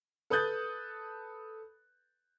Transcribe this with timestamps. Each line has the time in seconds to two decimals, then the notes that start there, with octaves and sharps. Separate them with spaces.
0.30 A4 B4 D#6 F#6 G6 A6